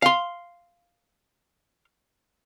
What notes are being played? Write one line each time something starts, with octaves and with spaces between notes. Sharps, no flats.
F5 C6